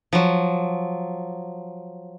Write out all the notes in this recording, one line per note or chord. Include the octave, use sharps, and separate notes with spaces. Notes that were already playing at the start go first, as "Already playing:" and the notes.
F3 F#3